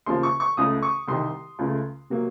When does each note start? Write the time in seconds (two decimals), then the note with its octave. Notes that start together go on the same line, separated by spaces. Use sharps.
0.06 D#2 C#3 F3 C6
0.23 C#6
0.40 C#6
0.57 C#2 C#3 A3 D#6
0.82 C#6
1.07 C2 C3 D#3 C6
1.59 C#2 C#3 A3
2.10 C3 F#3 A#3